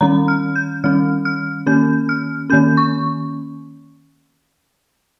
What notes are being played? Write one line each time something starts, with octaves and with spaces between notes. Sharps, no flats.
D#3 G3 C#4 A#5
F6
G6
D#3 G3 C#4 F6
F6
D#3 A#3 C#4 G6
F6
D#3 A#3 C#4 G6
C#6